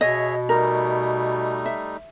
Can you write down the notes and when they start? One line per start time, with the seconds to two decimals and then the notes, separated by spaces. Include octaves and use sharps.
0.01 B2 G#4 C#5 D#5 E5
0.49 G3 A3 D#4 A#4
1.66 E5